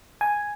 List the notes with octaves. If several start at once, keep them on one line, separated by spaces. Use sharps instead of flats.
G#5